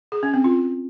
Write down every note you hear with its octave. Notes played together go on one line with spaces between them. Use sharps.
G#4
C#4
C4
F4